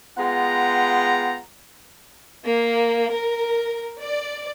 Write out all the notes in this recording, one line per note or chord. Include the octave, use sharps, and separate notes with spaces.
G#3 B3 F4 F#5 G5 A#5
A#3
A#4
D5